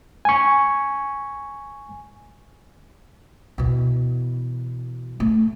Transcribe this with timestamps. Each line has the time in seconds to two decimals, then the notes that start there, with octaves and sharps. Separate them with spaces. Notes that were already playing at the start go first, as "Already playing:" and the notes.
0.25 G#5 C#6
3.58 B2 E3
5.20 A3